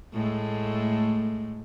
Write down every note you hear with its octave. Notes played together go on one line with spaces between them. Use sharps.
A2 G#3 A3